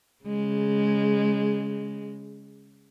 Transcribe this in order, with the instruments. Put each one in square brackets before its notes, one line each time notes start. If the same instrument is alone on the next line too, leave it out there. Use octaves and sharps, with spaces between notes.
[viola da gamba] C#3 G#3